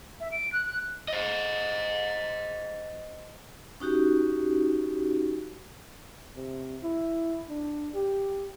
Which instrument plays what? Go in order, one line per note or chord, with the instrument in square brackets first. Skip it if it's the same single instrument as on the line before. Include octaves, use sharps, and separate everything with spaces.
[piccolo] E5
D7
F#6
F#6
[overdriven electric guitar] C5 D#5
[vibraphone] C#4 D#4 F#4 G4
[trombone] C3
E4
D4
G4